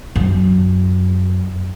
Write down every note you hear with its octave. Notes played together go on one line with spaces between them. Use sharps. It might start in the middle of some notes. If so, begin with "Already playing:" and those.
F#2